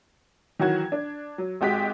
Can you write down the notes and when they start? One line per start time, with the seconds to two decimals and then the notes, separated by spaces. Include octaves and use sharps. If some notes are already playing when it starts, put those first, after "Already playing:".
0.59 D#3 E3 F#3 F#4 G#6
0.92 D4
1.38 F#3
1.61 G#1 G#3 F#4 G4 D#5 B6